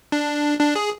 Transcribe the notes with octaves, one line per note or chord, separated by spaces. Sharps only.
D4
D4
G#4